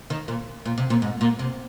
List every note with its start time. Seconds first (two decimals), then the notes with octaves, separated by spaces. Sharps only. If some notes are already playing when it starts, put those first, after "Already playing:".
0.10 D#3
0.28 A#2
0.66 A#2
0.78 C3
0.90 A#2
1.02 G#2
1.21 A#2
1.39 C3